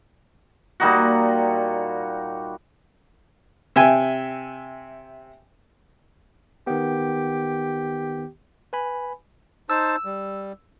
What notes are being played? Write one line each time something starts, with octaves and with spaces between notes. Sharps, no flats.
A#2 G3 D#4 F#4
C3 E5 G5 G#5
D#3 B3 G4
B4 G#5 B5
D#4 C5 A5 E6
G3